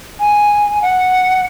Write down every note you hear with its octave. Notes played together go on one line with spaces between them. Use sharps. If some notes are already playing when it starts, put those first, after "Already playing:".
G#5
F#5